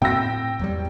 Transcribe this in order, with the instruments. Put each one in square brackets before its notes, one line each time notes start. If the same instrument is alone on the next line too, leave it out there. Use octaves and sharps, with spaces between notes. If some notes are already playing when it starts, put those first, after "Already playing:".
[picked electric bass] A2 C4 [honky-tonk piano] G5 E6 A#6
[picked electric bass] E2 F#3 G3